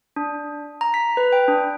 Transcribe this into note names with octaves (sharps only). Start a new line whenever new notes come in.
D4
A#5
B6
B4
G5
D4